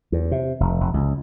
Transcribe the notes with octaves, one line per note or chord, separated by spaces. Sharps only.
E2
C3
F1
F1
C#2